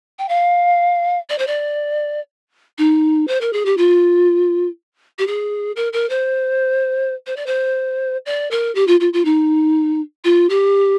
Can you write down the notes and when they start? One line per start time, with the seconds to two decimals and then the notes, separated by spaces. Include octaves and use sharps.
0.19 G5
0.29 F5
1.29 D5
1.38 C5
1.47 D5
2.78 D#4
3.27 C5
3.41 A#4
3.53 G#4
3.65 G4
3.77 F4
5.19 G4
5.27 G#4
5.76 A#4
5.93 A#4
6.10 C5
7.26 C5
7.36 D5
7.46 C5
8.26 D5
8.51 A#4
8.75 G4
8.87 F4
9.00 F4
9.13 F4
9.25 D#4
10.24 F4
10.49 G4